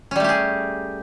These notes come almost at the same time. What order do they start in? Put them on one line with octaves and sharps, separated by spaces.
C#4 G3 A3 G4 G#4